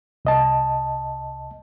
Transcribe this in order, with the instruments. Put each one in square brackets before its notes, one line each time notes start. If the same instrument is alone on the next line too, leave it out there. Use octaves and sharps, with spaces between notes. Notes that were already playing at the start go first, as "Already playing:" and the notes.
[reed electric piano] C2 D#5 A5